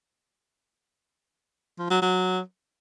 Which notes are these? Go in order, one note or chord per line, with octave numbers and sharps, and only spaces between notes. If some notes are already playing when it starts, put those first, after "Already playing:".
F3
F#3
F#3